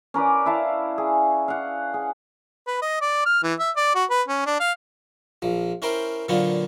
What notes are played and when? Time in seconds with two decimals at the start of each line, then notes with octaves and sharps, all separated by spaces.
0.14 C#4 A#4 B4 D5
0.46 E4 F5 A5
0.98 G#4
1.48 F5 F#5
1.94 G#4
2.67 B4
2.81 D#5
3.01 D5
3.26 F6
3.43 E3
3.59 E5
3.76 D5
3.95 F#4
4.10 B4
4.28 C#4
4.46 D4
4.60 F5
5.42 A#1 F3
5.82 C#4 E4 A#4 C5 G5
6.29 A#2 D3 F#3 B3 C4 F4